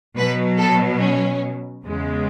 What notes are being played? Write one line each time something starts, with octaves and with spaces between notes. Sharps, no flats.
B2 F#3 B4
A4
C#4
E2 C#3 G#3